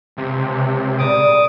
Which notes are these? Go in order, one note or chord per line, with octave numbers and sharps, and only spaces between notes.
C#2 C3
A#2 C#3 G3 D6 D#6